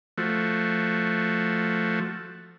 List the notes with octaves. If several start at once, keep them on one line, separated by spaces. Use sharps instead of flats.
F3 A3 F#4